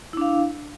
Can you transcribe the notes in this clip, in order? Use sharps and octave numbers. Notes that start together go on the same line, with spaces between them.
D4 E4 F5